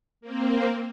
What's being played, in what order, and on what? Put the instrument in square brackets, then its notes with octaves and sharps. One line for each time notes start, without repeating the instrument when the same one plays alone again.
[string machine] A#3 C4